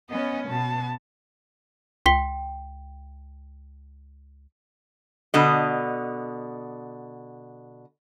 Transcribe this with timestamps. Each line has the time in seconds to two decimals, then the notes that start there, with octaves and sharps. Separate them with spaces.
0.10 B3 C#4 D#5
0.48 B2 B3 A5
2.06 C#2 G5 C6 B6 G7
5.34 B2 D3 D#5